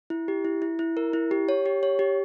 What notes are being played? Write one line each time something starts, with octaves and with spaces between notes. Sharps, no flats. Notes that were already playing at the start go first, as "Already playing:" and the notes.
E4
G4
E4
E4
E4
A#4
E4
G4
C#5
G4
C#5
G4